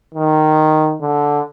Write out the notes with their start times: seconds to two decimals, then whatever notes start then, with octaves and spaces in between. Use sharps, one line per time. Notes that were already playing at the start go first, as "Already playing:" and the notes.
0.15 D#3
1.01 D3